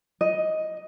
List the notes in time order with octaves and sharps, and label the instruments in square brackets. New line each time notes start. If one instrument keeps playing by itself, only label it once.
[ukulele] D#5